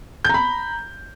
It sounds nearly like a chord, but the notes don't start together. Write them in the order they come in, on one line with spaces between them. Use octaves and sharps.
G6 A#5 B5